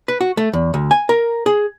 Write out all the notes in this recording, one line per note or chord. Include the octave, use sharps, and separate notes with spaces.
B4
F#4
A3
E2
D2
G#5
A#4
G#4